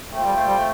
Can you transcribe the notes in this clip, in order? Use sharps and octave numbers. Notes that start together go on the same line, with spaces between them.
A3 C4 F4 A4 C5 G5
G3
A3
G3
A3